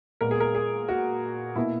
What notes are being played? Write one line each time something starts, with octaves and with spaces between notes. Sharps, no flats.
A#2 G#3 B3 A#4
G#4
A#4
G#4
F#4
B2 A#3 E4